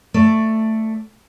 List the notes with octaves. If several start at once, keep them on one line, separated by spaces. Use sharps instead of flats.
A3 A4 D5